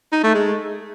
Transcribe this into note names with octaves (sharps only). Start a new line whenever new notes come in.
D#4
A3
G#3